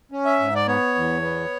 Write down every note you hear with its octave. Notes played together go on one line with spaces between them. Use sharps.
C#4
E5
G#2
D5
B3 C#5
E2
B3